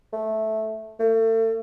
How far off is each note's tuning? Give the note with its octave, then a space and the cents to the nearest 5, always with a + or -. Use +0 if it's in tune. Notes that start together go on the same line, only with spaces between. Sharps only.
A3 -10
A3 +35